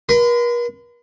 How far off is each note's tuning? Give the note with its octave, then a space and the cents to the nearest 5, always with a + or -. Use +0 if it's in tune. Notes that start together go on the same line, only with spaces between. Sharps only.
A#4 +45 C6 -45